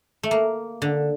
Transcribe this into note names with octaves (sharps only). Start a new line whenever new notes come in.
A3
A#3
D3